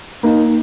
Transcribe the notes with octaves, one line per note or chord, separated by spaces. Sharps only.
A#3 D#4